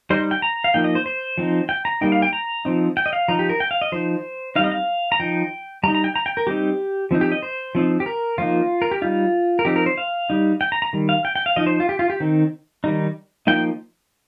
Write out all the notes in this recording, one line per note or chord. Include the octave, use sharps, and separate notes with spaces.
G3 D#4 C5
G5
A#5
F5
F3 A#3 D#4 G5
D#5
C5
C5
F3 C4 D#4
G5
A#5
G3 A#3 D#4 G5
F5
G5
A#5
F3 C4 D#4
G5
D#5
F5
F3 D#4 A#5
G4
A#4
G5
F5
D#5
F3 D#4 C5
G3 C4 D#4 F5
D#5
F5
A#5
F3 D#4 G5
G3 D#4 A#5
A#5
G5
A#5
G5
A#4
G3 C4 D#4 G4
F3 C4 D#4
G4
D#5
C5
F3 C4 D#4
G4
A#4
F3 A#3 D#4 F4
A#4
G4
G3 D#4 F4
A#4
F3 C4 D#4 G4
A#4
C5
F5
G3 D#4
G5
A#5
A#5
D#3 G3
F5
G5
G5
F5
F3 D#4 D#5
C5
F4
G4
F4
G4
D#3 C4 D#4
D#3 G3 D#4
F3 A#3 D#4 G5